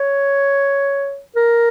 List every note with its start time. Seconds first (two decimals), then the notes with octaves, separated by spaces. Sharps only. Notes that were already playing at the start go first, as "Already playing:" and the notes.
Already playing: C#5
1.36 A#4